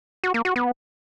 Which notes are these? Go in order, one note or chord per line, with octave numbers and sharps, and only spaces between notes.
F#4
A#3
F#4
B3